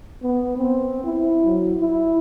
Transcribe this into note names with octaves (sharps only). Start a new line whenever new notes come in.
B3
C4
E4
F#3
E4